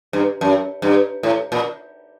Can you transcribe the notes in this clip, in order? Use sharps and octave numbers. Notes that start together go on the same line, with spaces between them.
G2
F#2
G2
A2
A#2